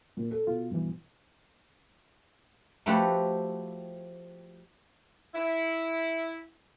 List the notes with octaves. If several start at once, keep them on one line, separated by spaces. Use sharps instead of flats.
A#2
A4
B2 F4
G2 E3
F3 A3 F#4 G4 B4 C5
E4